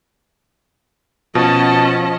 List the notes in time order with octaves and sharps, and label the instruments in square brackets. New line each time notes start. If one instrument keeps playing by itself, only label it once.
[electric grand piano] B2 [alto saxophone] F3 [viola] C#4 D#5 [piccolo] A5